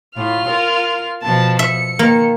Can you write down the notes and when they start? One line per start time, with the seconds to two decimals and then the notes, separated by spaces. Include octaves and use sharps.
0.16 A2 F4 F6
0.48 A#4
1.23 B2 F3 A5
1.59 E5 C#7
1.99 D#3 A#3